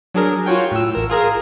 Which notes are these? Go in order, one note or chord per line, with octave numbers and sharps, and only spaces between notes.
F#3 D4 G#4 A#4
F4 F#4 C#5 G5
A2 E6
A1 A#4 E7
F4 G#4 A#4 F5